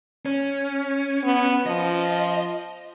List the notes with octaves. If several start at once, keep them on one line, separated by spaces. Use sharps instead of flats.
C#4
B3
F3 D#5